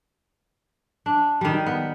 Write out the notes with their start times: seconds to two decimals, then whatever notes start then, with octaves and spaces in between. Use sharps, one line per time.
1.06 D4
1.41 D#3 G3
1.66 B3